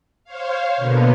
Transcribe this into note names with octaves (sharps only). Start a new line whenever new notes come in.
C5 C#5 F5
B2 D3 A#3 B3